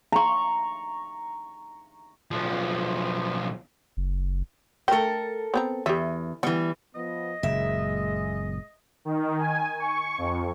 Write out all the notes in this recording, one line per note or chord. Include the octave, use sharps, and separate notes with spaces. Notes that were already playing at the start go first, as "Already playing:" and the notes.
A#5 C#6
B1 F3
F#1
A3 A4 A#4 G5
B3 C4 A#5
E2 G4 E5
E3 G3 B3
F3 B3 D#5
F#1 A#2 C#3 G#3 E5
D#3
G#5
C#6
F2